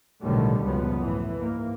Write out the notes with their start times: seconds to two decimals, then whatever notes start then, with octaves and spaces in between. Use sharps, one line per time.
0.23 B1 A2 D3 D#3 G3 A3
0.63 C#2 F#2 A#2 F3 B3
0.98 A2 E3
1.37 G#2 A#3